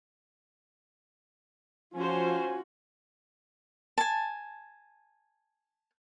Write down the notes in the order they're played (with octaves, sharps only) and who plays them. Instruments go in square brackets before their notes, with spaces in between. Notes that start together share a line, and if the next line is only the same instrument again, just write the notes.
[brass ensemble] F3 [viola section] C#4 C5 [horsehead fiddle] F4 F#4 [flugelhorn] G#5
[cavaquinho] G#5 A5